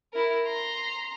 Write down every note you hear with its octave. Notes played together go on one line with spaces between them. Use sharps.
E4 A#4
A#5 C6